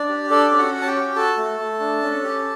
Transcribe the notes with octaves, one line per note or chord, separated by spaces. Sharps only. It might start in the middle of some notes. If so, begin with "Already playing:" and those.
Already playing: D4 D5
G4
D4 A4 D5
C#4
F#4 F#5
C#4
A5
G4 G5
F#4
F#4 A4 A5
A3
A3
D4
C#4
G4